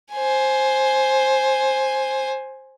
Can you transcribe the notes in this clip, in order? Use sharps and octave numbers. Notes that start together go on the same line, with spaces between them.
C5 G#5